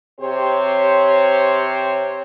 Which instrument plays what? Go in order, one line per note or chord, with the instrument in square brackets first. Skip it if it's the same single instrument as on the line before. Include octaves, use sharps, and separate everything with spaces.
[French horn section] C3 C4 G4 C5 C#5